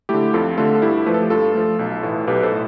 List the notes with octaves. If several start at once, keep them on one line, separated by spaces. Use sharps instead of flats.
D3 A3 E4 G4
F2 F4 A4
D3 A3 F4 A4
A4
G2 E4 G4
F3 A3 B4
A4
G4
G2 F4 A4
F3 A3
B1
A2 E3
B1 G4 B4
A4 C5
A2